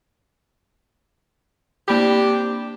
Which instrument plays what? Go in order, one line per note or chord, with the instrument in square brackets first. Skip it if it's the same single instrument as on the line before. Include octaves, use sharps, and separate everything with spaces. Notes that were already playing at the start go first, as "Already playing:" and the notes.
[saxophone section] C3 D4 G4 [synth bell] A#3 B5 G6